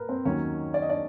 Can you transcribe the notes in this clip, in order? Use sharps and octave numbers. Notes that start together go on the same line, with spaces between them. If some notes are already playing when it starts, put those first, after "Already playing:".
Already playing: A#2 A#4 B4
C4 C5
D#2 D#3 F#3 C#4 C#5
D5
D#5
D4 D5